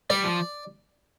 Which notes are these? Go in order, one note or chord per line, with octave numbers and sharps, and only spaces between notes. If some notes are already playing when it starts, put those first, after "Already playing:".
G3 D5
F3